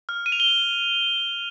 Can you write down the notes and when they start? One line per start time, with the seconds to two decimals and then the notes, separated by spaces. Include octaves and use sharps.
0.09 F6
0.26 D#7
0.32 F7
0.40 G7